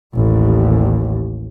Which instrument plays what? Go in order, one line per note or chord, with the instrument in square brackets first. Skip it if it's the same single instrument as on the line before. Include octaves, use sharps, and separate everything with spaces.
[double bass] A1 D#2